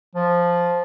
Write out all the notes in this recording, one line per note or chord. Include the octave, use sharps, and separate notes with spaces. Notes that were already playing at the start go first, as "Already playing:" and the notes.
F3